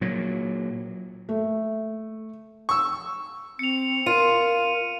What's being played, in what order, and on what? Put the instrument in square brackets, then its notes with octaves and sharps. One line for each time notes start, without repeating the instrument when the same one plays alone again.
[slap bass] A#2 F#3
[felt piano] A3
[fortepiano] C#6 E6
[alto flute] C4 [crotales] C#7 F7
[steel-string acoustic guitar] F4 [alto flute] A#4 [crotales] D#7